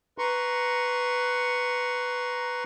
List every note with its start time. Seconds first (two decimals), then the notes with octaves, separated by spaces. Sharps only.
0.18 B4 A#5 C6 C#6